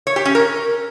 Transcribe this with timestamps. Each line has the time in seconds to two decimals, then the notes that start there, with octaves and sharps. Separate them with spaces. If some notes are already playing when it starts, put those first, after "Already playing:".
0.07 C#5
0.16 G4
0.25 C#4
0.35 A#4